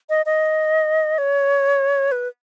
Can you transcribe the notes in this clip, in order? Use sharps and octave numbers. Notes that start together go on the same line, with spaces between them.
D#5
D#5
C#5
B4